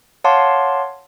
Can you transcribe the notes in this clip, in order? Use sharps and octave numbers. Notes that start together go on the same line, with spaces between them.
C#5 F5 F#5 A5 C6 D6